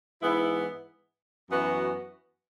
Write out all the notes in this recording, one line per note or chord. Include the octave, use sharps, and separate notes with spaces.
G#2 E3 B3 E4
F#2 E3 B3 F#4